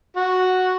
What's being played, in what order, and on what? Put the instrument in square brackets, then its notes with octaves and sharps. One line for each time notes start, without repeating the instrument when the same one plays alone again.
[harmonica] F#4